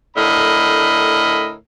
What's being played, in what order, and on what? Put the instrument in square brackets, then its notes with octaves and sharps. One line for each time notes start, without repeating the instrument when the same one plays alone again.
[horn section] A2 D3 A#4 D#5 B5